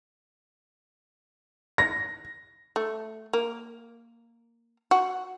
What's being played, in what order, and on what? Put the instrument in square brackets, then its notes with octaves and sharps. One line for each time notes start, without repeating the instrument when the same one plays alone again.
[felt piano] A#6
[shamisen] A3
A#3
F#4